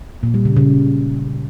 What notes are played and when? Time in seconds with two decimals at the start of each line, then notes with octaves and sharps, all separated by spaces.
0.23 A#2
0.34 G3
0.45 C#3
0.56 C#3